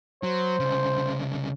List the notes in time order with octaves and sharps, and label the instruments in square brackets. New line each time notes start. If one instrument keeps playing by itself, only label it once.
[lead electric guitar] F#3 [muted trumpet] C5
[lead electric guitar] C2 C#3